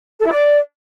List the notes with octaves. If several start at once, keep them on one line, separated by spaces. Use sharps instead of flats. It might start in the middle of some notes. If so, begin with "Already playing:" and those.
A4
E4
D5